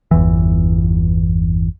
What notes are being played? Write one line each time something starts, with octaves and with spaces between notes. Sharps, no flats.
G1 E2 E3